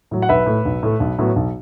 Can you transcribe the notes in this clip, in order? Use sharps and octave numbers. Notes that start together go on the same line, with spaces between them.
A2 F#3
F#5
B1 B4 E5
A2 A3
B1
A2 A3
B1
A2 F#3 B3
B1